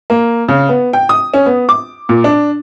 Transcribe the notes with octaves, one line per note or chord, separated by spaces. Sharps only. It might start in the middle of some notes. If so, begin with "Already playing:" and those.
A#3
C#3
B3
G5
D#6
C#4
B3
D6
A#2
D4